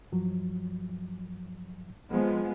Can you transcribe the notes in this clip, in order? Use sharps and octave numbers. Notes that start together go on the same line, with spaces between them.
G2 F3 F#3
F3 G#3 B3